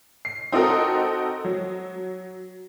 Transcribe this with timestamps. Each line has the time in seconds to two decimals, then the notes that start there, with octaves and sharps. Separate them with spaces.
0.25 C7
0.52 C4 D#4 F#4 A4 A#4
1.45 F#3